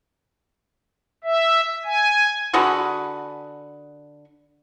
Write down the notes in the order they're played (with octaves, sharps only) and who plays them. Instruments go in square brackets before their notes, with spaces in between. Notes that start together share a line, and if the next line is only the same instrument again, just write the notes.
[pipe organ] E5
G#5
[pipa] D3 F#4 G#4 B4